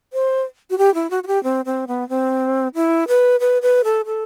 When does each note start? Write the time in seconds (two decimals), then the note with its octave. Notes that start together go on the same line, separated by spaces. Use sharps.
0.13 C5
0.70 F#4
0.78 G4
0.94 E4
1.10 F#4
1.23 F#4
1.27 G4
1.43 C4
1.65 C4
1.87 B3
2.09 C4
2.75 E4
3.08 B4
3.40 B4
3.62 B4
3.84 A4
4.06 A4